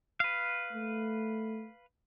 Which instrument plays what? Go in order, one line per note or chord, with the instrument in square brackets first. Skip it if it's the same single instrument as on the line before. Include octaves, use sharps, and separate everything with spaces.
[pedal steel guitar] B4 F5
[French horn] A3